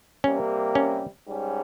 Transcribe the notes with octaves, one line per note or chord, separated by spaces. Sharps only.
C3 G3 A#3 C#4
C#4
G#2 G3 C#4